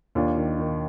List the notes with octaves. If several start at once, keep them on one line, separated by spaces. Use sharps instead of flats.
D#2 D4 F4
D#3
D#3